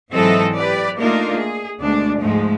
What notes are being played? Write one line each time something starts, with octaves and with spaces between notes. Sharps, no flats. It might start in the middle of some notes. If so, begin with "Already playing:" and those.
G#2 E3 F#3 C4 A4 D#5
G4 B4 D5
A3 A#3 D4 D#4 F4 A#4
G#4
D2 B2 G#3 D4
G#2 F3 G#3 A3